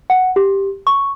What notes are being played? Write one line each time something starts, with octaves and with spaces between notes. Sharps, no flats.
F#5
G4
C#6